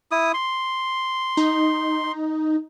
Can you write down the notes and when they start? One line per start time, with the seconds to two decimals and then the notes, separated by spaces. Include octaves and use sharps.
0.11 E4 D#6
0.34 C6
1.37 D#4